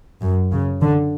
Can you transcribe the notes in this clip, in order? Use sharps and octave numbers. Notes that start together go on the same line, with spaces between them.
F#2
C#3
D3